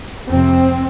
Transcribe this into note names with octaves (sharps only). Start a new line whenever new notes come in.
F2 C3 C4